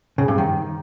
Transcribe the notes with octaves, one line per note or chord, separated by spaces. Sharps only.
C#3
G2
D#3